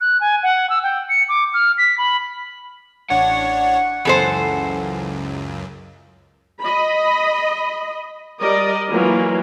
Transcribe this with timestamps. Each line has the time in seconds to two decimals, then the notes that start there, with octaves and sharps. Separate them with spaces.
0.01 F#6
0.21 G#5
0.43 F#5
0.70 E6
0.83 G5
1.09 C#7
1.29 D6
1.54 F6
1.78 B6
1.98 B5
3.10 A1 D4 C#5 F#5
4.05 C#2 F#2 E3 A4 C5
6.62 D#5 B5
8.39 G3 A#4 D5 D#5
8.92 E3 F#3 A#3 F4